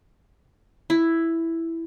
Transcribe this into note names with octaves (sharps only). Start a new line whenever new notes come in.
E4